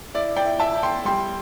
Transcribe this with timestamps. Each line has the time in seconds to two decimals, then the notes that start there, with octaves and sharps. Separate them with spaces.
0.14 E4 D5
0.37 D5 G5
0.45 E4
0.60 E5 A5
0.75 E4
0.83 G5 C6
1.05 G3 G5 C6